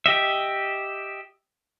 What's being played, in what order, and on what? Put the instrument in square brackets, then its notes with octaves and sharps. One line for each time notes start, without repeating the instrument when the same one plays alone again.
[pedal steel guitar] G4 D#5 E5